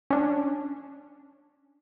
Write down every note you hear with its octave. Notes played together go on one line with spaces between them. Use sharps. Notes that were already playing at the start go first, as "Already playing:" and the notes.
C#4 D4